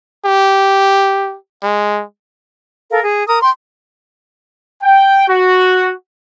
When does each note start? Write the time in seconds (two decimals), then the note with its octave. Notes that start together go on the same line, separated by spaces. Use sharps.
0.25 G4
1.63 G#3
2.91 A4 A#4 F5
3.04 G#4
3.27 A#4 D#6
3.42 G5 C6
4.83 G5
5.28 F#4